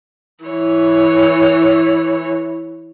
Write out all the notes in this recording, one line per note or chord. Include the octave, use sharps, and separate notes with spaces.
E3 C#5